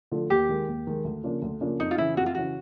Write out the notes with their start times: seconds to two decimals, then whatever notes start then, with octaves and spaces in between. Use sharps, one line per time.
0.12 D3 F3 A3
0.30 D#2 G4
0.49 D#3 G#3
0.68 D#2
0.87 D#3 G#3
1.04 D2
1.23 C#3 F3 A#3 D4
1.42 D2
1.61 C#3 F3 A#3 D4
1.79 F2 D#4
1.91 F4
1.98 C#3 E3 E4
2.17 F2 F#4
2.26 F4
2.35 C#3 E3 F#4